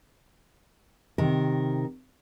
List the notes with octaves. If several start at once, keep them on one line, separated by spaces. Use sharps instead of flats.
C3 D#3 A#4